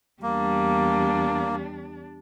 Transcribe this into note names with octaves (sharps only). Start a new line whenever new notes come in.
E2 G3 A#3 D4